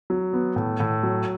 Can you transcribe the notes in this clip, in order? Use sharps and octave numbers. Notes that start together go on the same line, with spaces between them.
F#3
B3
A2
A2
F#3